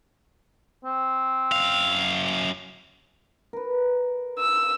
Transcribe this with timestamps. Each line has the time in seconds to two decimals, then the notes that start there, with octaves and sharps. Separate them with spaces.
0.85 C4
1.52 F#2 F5
3.53 A#4 B4
4.39 E6